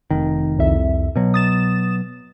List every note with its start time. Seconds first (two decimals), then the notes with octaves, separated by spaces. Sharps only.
0.10 F1 D#3
0.59 C2 F2 E5
1.16 B2 F#3
1.34 D#6 A6 E7